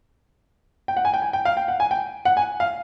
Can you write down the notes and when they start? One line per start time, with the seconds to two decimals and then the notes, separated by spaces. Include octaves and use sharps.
0.88 G5
0.97 F#5
1.05 G#5
1.14 G5
1.22 G#5
1.33 G5
1.45 F5
1.57 G5
1.68 F#5
1.80 G#5
1.91 G5
2.25 F#5
2.37 G#5
2.60 F5